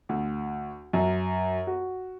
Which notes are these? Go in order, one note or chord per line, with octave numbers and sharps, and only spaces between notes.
D2
F#2
F#4